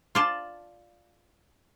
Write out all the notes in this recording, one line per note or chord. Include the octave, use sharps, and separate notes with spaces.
F4 D5 A5